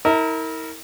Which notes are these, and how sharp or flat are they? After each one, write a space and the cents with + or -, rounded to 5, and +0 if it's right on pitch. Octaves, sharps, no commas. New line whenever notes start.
E4 -40 A#4 -20